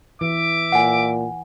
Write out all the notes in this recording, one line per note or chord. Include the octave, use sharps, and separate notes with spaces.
E3 E5 D6
A#2 F#5 G#5